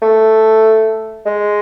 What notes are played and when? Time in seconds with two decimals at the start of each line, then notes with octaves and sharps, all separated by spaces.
0.02 A3
1.26 G#3